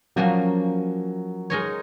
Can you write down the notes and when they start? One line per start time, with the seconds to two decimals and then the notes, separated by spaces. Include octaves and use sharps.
0.16 F3 F#3 A#3 C#4 F#4
1.50 G#3 D#4 A#4 C#5